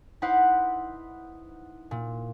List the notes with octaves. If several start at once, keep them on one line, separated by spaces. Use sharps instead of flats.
D#4 E4 B4 C5 F#5
A#2